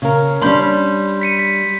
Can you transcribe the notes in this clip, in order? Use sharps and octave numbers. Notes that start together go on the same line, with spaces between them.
C#3 A#4
G3 C#4 D4 B5 C6 G6
B6 C#7 D#7
B6